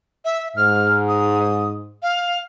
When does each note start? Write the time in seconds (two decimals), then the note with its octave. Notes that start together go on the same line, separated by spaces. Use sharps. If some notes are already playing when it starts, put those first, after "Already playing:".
0.25 E5
0.56 G#2 F6
1.08 D#6
2.02 F5